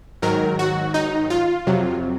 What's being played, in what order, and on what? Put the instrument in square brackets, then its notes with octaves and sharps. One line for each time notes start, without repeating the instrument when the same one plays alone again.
[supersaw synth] G#2 D#3 F#3 A#4
F#4
D#4
F4
F2 C3 F#3